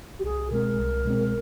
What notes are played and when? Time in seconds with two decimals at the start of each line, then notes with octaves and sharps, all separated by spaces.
0.19 G4
0.24 C2 G#4
0.51 B2 G#3 C4 A#4
0.79 C2
1.05 B2 G#3 C4